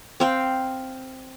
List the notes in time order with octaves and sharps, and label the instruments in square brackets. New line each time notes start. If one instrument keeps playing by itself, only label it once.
[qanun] C4 F5 G5